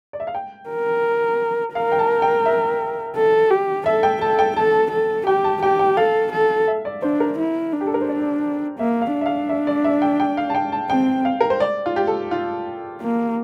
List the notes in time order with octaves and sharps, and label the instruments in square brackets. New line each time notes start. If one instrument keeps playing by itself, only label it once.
[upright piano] D5
E5
F5
G5
[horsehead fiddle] A#4
[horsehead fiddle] A#4 [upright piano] F5
[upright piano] G5
A5
G5
E5
[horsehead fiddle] A4
G4
[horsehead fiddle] A4 [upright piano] E5
[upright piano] G5
[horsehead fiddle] A4 [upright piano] A5
[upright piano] G5
[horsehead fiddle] A4 [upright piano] A5
[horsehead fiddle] A4
[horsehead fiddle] G4 [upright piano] G5
[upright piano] A5
[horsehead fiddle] G4 [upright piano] G5
[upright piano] G5
[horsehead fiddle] A4 [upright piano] F5
[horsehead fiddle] A4
[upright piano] E5
D5
[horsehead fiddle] D4 [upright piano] C5
[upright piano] A#4
[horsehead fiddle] E4
D4
[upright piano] G4
A4
A#4
C5
D5
[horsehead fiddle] A#3 [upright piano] E5
[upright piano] F5
[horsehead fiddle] D4
[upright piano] E5
F5
E5
D5
E5
G5
G5
F5
A5
G5
A5
[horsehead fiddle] C4 [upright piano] G5
[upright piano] F5
A#4
C5
D5
F4
G4
A4
F4
[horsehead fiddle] A#3